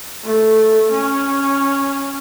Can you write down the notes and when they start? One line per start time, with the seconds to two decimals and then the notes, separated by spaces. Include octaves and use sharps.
0.24 A3
0.91 C#4